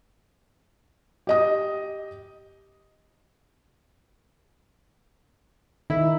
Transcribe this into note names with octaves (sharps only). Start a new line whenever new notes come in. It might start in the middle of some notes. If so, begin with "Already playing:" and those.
G4 D#5 D#6
D#3 D#4 E4